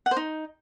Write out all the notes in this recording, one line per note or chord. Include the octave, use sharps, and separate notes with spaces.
F#5
C5
D#4